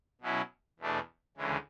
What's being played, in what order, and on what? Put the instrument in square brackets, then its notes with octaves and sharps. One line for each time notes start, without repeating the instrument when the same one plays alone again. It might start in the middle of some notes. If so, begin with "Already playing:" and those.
[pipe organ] B2 F#3 C#4 E4
E2 B2 A3 D4
D2 C#3 E3 G#3